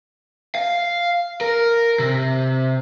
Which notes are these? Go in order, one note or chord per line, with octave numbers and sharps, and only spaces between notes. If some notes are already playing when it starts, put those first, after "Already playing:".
F5
A#4
C3